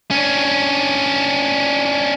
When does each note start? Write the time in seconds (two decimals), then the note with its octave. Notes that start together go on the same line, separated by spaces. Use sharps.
0.11 C#4 D4